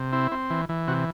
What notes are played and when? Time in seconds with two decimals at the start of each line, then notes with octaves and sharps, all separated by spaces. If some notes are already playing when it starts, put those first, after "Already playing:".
Already playing: C3
0.12 C4 E4
0.31 C4
0.50 E3
0.69 E3
0.88 C3 F#4